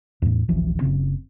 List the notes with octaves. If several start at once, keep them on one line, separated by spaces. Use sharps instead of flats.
E2 A2
D1 G#1 E3 F3
F#1 D#2 C#3 C4